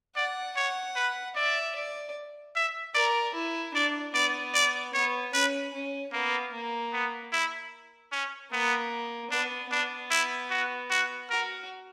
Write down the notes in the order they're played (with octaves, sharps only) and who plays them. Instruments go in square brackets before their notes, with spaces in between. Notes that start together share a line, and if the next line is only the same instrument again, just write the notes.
[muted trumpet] D5 [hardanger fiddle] F#5
[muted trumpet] C#5 [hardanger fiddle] F#5
[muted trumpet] B4
[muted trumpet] D5 [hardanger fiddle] E5
[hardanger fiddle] D5
[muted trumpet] E5
[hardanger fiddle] A#4 [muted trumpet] D5
[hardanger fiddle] E4
[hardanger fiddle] D4 [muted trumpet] D5
[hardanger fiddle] B3 [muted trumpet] D5
[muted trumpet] D5
[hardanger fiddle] B3 [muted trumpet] C#5
[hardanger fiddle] C#4 [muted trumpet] B4
[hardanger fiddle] C#4
[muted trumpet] A#3 [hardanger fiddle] B3
[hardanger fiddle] A#3
[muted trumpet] B3
E4
C#4
[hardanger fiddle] A#3 [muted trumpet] B3
[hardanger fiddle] B3 [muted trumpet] D4
[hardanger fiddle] B3 [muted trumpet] D4
[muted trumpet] E4
F#4
F#4
[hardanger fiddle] F#4 [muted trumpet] A#4